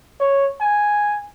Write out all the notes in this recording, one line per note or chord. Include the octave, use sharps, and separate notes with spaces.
C#5
G#5